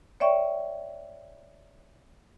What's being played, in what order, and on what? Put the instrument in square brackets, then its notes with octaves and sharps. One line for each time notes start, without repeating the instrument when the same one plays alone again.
[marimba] C#5 D5 E5 G5 C#6